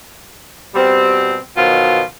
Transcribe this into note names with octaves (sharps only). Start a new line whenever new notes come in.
B2 G3 C4
B2 D#3 F3 F#3 F4